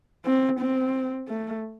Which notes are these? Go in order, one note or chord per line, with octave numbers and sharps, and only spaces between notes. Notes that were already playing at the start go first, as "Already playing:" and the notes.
C4
C4
A3